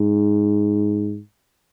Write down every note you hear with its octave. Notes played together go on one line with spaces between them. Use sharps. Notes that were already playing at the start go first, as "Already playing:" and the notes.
Already playing: G#2